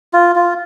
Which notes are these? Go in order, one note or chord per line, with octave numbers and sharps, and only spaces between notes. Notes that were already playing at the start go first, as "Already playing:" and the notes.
F4
F4